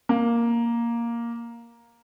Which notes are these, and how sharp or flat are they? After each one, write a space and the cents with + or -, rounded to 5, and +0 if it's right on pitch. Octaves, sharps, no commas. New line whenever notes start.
A#3 +5